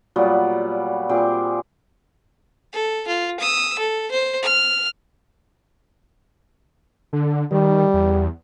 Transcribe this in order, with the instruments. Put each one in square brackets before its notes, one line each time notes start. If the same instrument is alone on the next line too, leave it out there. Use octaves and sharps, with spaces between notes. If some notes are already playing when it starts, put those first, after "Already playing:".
[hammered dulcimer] A#2 F#3 G3 B3
A#2 C4 G4 G#4
[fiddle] A4
F4
D#6 E6
A4
C5
F6
[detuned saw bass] D3
[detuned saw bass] D#3 [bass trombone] G3
[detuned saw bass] E2